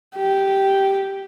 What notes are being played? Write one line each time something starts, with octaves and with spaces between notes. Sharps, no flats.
G4